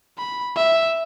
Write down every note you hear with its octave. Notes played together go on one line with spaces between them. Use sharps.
B5
E5